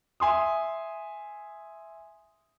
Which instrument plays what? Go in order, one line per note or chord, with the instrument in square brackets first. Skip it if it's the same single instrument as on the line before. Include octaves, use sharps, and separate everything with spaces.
[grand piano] E5 G#5 C6 D#6